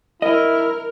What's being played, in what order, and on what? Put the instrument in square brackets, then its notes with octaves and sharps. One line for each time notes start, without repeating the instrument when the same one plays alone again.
[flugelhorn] E4 [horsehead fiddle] A#4 [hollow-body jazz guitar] D#5